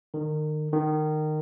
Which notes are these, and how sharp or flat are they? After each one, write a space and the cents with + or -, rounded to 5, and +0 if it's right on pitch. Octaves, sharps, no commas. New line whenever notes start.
D#3 -30
D#3 -20